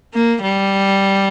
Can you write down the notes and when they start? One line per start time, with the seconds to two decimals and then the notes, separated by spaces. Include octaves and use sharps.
0.14 A#3
0.42 G3